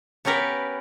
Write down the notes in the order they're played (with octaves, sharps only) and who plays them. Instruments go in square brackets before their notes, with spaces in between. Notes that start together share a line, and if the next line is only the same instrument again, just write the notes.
[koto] B3 C#4 G4 A#4 B4